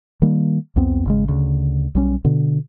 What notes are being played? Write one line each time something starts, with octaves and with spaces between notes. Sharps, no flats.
D#3 G3 A#3
C2 F2 B3 C4
G#1 C#3 G#3
D2 C#3
B1 G3 C#4
B2 D3